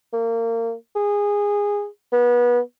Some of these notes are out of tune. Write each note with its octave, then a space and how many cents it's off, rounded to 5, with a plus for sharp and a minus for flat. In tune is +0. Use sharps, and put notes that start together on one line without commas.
A#3 -25
G#4 -20
B3 -25